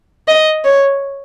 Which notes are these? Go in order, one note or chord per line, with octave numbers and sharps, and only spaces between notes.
D#5
C#5